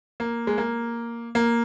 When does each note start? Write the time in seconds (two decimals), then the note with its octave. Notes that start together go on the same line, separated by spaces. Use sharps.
0.20 A#3
0.47 G#3
0.58 A#3
1.35 A#3